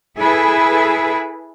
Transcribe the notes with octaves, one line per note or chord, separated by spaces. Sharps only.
E4 G#4 A4 B4 E5